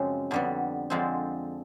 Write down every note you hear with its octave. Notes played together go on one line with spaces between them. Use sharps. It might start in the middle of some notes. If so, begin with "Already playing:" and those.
Already playing: F#2 C#3 F3 G#3 C4
F2 D3 G3 B3
F2 D3 F3 G#3 C4